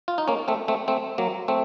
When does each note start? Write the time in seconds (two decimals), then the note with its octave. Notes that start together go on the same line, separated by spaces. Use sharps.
0.08 F4
0.18 D#4
0.28 A#3 C#4
0.48 A3 C4
0.68 A3 C4
0.88 A3 C4
1.18 F#3 A#3
1.48 A3 C4